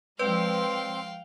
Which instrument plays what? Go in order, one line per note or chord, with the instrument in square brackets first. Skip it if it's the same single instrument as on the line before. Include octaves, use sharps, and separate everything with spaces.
[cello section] F3 G#3 [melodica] C4 C6 [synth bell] B4 D5 [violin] F5 G5